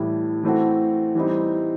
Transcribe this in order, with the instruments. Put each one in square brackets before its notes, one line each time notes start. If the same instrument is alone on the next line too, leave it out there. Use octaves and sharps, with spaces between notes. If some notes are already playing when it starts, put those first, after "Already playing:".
Already playing: [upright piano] A2 E3 G3
E3 A3 C4 F#4
E3 G3 C4 D#4